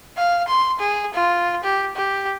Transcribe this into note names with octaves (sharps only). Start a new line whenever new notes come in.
F5
C6
G#4
F4
G4
G4